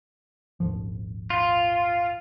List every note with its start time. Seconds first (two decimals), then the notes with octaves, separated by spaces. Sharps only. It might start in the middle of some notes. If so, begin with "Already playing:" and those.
0.60 D#1 G#1 F3
1.30 F4